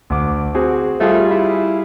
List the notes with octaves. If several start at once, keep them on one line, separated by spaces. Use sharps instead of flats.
D2 D6
C4 F#4 G#4
G3 A3 F4 G#4
E4